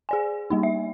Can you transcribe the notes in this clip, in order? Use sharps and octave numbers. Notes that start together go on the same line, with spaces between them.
G#4 D5 G#5
G3 A#3 D#4
E5